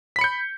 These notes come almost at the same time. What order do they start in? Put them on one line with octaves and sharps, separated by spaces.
B6 B5 C#7 G6